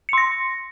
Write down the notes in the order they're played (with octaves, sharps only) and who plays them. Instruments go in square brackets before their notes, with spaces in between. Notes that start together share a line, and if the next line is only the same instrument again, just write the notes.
[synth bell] C#7
C6
A#6